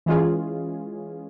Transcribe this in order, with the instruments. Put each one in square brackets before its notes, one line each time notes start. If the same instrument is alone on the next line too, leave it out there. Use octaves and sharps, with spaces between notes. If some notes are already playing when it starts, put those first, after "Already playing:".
[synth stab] E3 G#3 C#4 F4 G#4